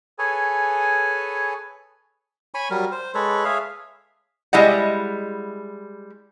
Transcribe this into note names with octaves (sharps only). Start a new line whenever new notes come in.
G#4 A4 B4 C#5 G#5
C#5 G#5 B5 C#6
F#3 G3 A#4
C5
G#3 A4 B4 C#5
G#4 C#5 E5 F5
G3 G#3 E4 D#5 F#5